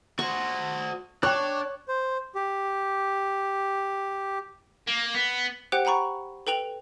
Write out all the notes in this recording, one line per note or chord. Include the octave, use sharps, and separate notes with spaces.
F#4 C5 C#6
D4 C#5 G5 C#6 D6 F#6
C5
G4
A#3
B3
G4 C5 F#5 G5 F#6
F#5 G5 A#5 B5 C#6
A4 B4 G5 F7 F#7